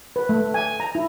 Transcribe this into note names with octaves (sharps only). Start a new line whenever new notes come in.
B4
A3
G#5
A#5
E4